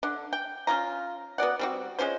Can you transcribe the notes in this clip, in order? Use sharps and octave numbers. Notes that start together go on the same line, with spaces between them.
D3 D4
G5
C#4 D#4 F4 A#5
B3 F#4 D5 F#5
G3 C4 F#4
G#3 C#4 F4 C5